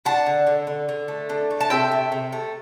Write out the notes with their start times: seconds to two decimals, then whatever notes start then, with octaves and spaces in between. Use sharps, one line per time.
0.05 D4 F#5 A5
0.26 D3
0.47 D3
0.67 D3
0.89 D3
1.08 A3
1.30 D4
1.50 A3
1.61 A5
1.70 C3 E5 G5
1.92 C3
2.12 C3
2.33 A3